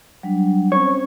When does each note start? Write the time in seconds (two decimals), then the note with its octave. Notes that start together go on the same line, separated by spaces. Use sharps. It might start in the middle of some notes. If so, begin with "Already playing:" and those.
0.23 F#3 G3 D4
0.72 C4 C#4 C5 C#5